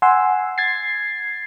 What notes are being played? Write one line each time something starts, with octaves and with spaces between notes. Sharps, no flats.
F#5 G#5 C6 E6
G#6 A6 C7